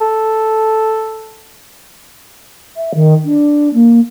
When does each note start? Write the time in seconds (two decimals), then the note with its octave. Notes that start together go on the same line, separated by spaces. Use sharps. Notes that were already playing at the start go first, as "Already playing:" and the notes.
0.01 A4
2.76 E5
2.94 D#3
3.24 D4
3.74 A#3